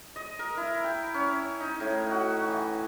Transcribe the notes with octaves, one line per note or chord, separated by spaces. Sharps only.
D#5
A#4
E4
G5
C#4
D#4
A2
F#4
E3